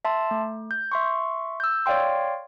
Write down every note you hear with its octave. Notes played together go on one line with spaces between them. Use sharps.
E5 A5 C6
A3
G6
E5 C6 C#6
E6 G6
C#5 D5 F5 G5 C6